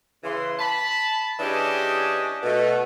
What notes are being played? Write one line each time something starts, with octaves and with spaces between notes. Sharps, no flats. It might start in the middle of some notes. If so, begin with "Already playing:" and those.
C#3 E3 C6
A5 B5
E3 C#4 D4 G4 G#4 D#5
B2 A3